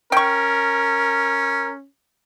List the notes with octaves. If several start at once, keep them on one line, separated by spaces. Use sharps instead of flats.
C#4 A#4 G5 C#6